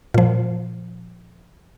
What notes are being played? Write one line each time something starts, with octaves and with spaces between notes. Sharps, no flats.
A#2 F3